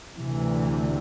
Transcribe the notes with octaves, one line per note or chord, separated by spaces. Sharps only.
D2 C3 E3